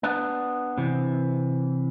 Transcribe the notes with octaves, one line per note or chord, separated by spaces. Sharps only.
B3 D4
C3 E3